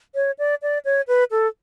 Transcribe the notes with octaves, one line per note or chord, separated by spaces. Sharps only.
C#5
D5
D5
C#5
B4
A4